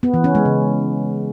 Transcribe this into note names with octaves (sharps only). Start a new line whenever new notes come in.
B3
E3
C#4
G#3
C#3